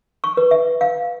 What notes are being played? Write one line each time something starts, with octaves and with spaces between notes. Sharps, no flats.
C#6
B4
E5
F5